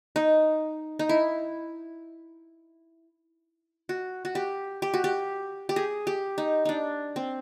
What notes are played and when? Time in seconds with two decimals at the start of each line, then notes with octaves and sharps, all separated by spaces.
0.16 D#4
0.99 D#4
1.09 E4
3.89 F#4
4.25 F#4
4.35 G4
4.82 G4
4.94 F#4
5.04 G4
5.69 G4
5.76 G#4
6.07 G4
6.38 D#4
6.65 D4 D#4
7.16 C4